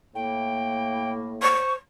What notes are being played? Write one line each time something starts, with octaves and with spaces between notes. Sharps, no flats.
A2 A#3 G5
C5 C#6